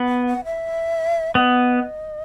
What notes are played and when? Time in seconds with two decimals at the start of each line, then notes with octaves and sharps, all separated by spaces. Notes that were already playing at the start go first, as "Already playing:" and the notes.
Already playing: B3
0.08 F#5
0.27 F#5
0.45 E5
1.35 B3 D#5